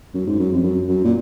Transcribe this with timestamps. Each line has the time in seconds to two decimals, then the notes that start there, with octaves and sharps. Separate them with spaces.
0.14 F#2
0.27 G#2
0.39 F#2
0.51 F2
0.63 F#2
0.88 F#2
1.04 A#2